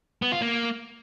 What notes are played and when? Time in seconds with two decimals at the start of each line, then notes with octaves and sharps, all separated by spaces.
0.22 B3
0.32 F4
0.42 A#3